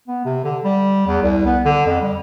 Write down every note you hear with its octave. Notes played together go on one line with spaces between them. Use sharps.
B3
C3
D3
G3
E2
C2
B3
D3
F2
G3